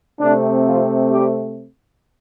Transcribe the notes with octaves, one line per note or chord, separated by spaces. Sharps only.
C3 A3 C4 D4
F3 F4
G3 G4